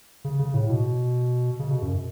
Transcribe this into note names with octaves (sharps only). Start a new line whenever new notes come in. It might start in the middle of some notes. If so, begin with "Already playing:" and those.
C#3
C#3
A2
B2
C#3
B2
F#2